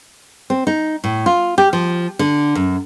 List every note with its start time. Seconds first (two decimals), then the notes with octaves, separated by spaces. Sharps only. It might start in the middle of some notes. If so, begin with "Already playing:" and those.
0.50 C4
0.67 D#4
1.04 A2
1.26 F4
1.58 G4
1.73 F3
2.19 D3
2.55 F#2